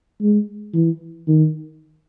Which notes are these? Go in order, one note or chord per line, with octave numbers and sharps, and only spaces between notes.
G#3
E3
D#3